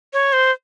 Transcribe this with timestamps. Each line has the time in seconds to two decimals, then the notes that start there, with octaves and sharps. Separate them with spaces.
0.13 C#5
0.33 C5